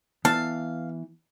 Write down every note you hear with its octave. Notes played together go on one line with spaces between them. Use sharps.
E3 B3 F5 A5